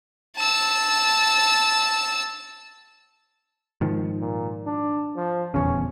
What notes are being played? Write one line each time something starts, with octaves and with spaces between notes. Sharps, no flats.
A5 E6
G#2 D#3 F3
A#2
D4
F3
D#1 E2 C#3 C#4